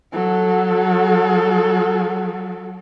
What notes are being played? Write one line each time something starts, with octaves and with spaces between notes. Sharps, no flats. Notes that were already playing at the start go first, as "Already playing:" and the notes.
F#3 A4